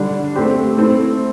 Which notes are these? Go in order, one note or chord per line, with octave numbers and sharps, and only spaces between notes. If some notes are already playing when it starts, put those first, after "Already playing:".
Already playing: D3 G3 D4
A3 C4 G4 C5
A3 C4 E4